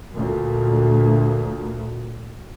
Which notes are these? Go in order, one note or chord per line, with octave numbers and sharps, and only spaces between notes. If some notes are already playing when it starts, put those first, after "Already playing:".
D2 A#2